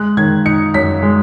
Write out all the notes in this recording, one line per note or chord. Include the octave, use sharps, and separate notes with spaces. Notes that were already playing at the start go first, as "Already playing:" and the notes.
Already playing: G#3 F#6
D#3 G#6
D#4 C#7
F#2 B6
G#3